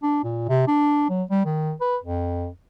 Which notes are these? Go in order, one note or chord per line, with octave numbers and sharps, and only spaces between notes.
D4
A#2
C3
D4
F#3
G3
D#3
B4
F2